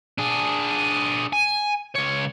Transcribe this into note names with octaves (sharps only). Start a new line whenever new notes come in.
D4 G#4
G#5
C#2 C#5